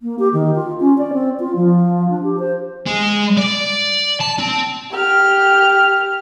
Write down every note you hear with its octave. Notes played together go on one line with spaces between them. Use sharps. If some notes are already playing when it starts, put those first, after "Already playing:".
A#3
G4
D#3
F4
C#4
D5
C4
F4
F3
D4
G4
C5
G#3
D5
A5
C4
G4 F6